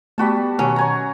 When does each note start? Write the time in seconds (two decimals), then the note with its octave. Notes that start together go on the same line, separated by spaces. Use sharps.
0.18 G3 A3 B3 F#4 A5 B6
0.59 B2 D#3 F#3 C#4
0.76 C#5 G#5 A#5